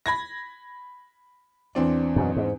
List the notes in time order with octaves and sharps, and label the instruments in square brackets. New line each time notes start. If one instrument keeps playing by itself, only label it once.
[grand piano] B5 G#6 A#6
E2 C4 D4
[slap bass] F#2 B2
G#2